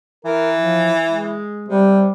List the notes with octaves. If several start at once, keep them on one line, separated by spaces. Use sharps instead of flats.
E3 A#4
F3
G#3
C3 G3